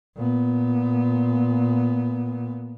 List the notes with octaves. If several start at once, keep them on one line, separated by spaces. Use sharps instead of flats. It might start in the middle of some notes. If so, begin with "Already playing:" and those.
A#2 B3